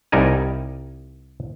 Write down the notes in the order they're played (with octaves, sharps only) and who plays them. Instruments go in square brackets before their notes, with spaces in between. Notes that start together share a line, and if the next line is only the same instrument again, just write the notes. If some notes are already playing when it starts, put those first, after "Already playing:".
[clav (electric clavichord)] C2 G3 D#4 A#4 G#5